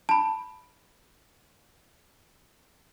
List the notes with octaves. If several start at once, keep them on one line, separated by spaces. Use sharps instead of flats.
A5 B5